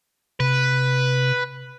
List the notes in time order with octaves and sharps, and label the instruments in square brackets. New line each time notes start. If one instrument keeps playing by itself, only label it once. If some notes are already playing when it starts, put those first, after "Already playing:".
[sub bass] C3 [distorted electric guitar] B4